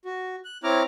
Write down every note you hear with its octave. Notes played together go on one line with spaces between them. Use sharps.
F#4
F#6
C4 E4 C#5 A#5 D6 F6